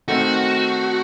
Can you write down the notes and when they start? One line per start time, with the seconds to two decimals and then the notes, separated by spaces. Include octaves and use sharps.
0.08 D#3 A3 C4 D#4 F#4 A4